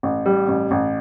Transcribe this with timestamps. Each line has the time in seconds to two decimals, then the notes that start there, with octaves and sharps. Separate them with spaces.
0.03 A1
0.26 G3
0.48 A1
0.71 A1